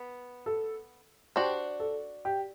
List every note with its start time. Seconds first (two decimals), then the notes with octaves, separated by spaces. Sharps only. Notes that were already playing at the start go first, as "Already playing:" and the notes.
Already playing: B3
0.46 A4
1.36 D4 F#4 G4 C5
1.80 A4
2.25 G4